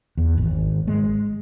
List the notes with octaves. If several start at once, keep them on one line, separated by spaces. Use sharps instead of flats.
E2
G#1
G#3